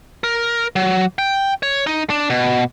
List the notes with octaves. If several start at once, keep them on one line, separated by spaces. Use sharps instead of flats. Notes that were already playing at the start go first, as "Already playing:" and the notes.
A#4
F#3
G5
C#5
D#4
D4
B2